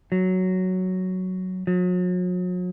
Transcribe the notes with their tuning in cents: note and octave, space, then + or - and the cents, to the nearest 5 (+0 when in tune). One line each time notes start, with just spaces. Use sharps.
F#3 +5
F#3 -40